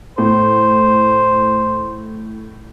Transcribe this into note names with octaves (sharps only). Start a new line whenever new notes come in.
A2 C5